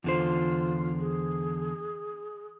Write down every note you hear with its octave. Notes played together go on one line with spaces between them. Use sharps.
E2 D3 F4 C5
G#4